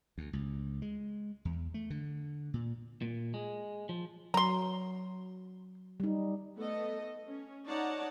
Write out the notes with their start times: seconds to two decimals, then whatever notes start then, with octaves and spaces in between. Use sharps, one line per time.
0.18 D2
0.33 C#2
0.82 G#3
1.45 E2
1.74 A3
1.90 D3
2.54 A#2
3.02 A#2
3.34 G#3
3.89 F3
4.34 F#3 A#5 C6
6.00 G3 D#4
6.56 A3 B3 A4 D#5
7.26 C#4
7.66 D#4 C#5 D5 F#5 A5 A#5